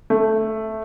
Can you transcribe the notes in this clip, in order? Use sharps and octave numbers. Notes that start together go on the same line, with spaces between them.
A3